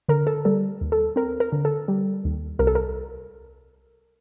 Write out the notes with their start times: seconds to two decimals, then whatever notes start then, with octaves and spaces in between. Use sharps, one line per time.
0.09 D3 A#4
0.27 A4
0.45 G3 A4
0.81 D#2
0.92 A4
1.16 C4 A#4
1.40 A#4
1.52 D3
1.65 A4
1.88 G3
2.24 D#2
2.59 C2 A#4
2.67 A4
2.75 A#4